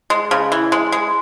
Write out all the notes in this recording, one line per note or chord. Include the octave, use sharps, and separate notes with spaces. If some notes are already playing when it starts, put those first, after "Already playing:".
G#3
C#3
E3
G#3
G#3